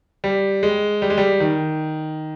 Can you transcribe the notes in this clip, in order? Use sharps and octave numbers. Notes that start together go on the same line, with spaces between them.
G3
G#3
G3
G#3
G3
D#3